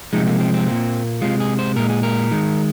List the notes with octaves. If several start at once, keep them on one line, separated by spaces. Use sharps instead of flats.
C3 F3 G#3 D#4
A#3
C4
C4
A#2 A#3
C3 G#3 F4
G#4
C5
A#2 G#3 A#4
G#4
A#4
D#3 G#3